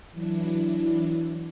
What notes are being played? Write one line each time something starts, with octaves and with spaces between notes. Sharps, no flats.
E3 F#3 D4 E4